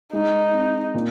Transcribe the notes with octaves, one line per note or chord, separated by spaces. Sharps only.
G#3 D#4
C4
A#2